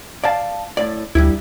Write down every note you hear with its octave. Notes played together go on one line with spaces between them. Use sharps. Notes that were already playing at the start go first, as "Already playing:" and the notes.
D5 F5 A5
A2 D5
D2 G2 G3 E4